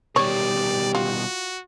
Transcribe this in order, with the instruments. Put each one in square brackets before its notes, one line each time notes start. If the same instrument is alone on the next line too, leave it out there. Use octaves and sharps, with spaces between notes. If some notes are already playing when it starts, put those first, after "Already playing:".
[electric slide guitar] B2 D#3 G3 [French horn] G4 [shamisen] C#5 [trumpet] D5
[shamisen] F4 [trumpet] F#4